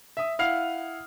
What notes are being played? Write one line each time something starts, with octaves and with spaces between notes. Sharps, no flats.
E5 D#6
E4 F5 F#5 F6 C7 F7